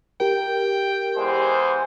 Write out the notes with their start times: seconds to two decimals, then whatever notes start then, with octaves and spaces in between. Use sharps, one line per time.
0.20 G4 A#4 G5
1.16 E2 G#3 C5